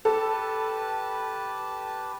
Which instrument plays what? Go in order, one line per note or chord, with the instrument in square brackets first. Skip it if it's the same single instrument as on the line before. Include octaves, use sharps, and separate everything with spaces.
[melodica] G4 B4 A5 [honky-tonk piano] A4